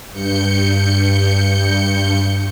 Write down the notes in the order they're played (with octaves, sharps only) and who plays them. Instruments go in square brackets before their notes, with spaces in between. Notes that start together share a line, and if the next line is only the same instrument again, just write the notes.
[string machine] G2 G6 C#7